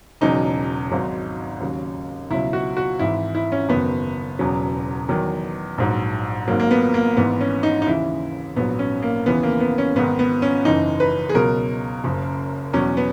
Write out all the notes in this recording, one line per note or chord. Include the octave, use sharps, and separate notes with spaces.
E1 E2 C#3 F#3 D#4
G#1 G#2 F#3
D#2 C#3 F#3
C#2 B2 F#3 E4
F#4
F#4
G#1 G#2 E3 E4
E4
C#4
F#1 F#2 D#3 F#3 B3
E1 E2 C#3 F#3
E2 D#3 F#3
A#1 G#2 F#3
G#1 G#2 F#3 A#3
A#3
B3
A#3
G#1 G#2 E3 B3
C#4
D#4
D#4
D#2 C#3 E3 E4
A#1 G#2 F#3 B3
C#4
A#3
D#2 C#3 E3 B3
A#3
B3
C#4
G#1 G#2 D#3 B3
B3
C#4
F#1 F#2 E3 D#4
B4
G#4
C#2 B2 F#3 A#4
F#1 F#2 C#3
E2 B2 F#3 C#4
B3